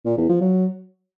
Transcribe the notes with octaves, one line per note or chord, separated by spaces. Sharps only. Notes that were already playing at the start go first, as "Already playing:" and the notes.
A#2
E2
F3
F#3